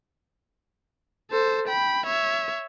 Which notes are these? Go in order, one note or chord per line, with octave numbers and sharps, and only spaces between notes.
A4 C5
G5 B5
C#5 E5